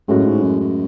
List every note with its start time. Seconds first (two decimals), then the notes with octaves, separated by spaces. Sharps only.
0.08 F#2 A2 G#3 C#4 F#4
0.26 G#2
0.43 F#2
0.60 F#2